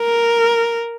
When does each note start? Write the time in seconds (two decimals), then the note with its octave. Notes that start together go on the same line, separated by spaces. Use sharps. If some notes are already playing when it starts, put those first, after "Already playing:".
Already playing: A#4